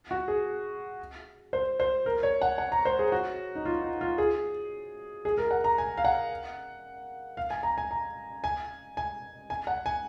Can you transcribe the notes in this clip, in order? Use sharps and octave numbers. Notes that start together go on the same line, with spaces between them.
F#4
G#4
C5
C5
A#4
C#5
F#5
F#5
A#5
C5
G#4
F#4
D#4
F4
D#4
F4
G#4
G#4
A#4
F#5
A#5
G#5
F5
F#5
F5
G#5
A#5
G#5
A#5
G#5
G#5
G#5
F#5
G#5